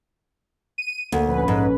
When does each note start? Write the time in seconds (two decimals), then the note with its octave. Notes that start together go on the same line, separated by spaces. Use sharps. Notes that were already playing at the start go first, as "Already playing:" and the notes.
0.78 D#7
1.12 D2 A#3
1.27 A#1 C#4 B4
1.48 G#2